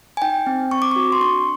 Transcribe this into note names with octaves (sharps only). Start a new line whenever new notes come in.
G#5
D#4 G5
C4
C4 C#6
D6
F#4 C#6
C6
D4 C#6